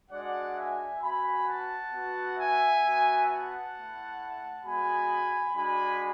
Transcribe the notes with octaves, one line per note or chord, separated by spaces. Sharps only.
G#3 D4 F#4 D5 F#5
E5 G#5
B3 F#4 G#5 B5
F#5 A5
B3 F#4
E5 G#5
B3 F#4
F#5 A5
A3 E4
G#3 B3 F#4 G#5 B5
G#3 D4 F#4 G#5 B5